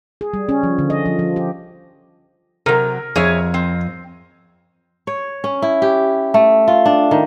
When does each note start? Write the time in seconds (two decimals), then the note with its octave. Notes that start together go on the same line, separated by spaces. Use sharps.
0.21 G#4
0.34 G3
0.49 C#4
0.63 F3
0.79 D3
0.90 D#5
1.06 F3
1.19 F3
1.36 G4
2.66 C3 F#3 A#4
3.16 F2 G#4 C#5 E5
3.54 C4
5.07 C#5
5.44 C#4
5.62 E4
5.82 G4
6.34 A3
6.68 F4
6.85 D4
7.11 D#3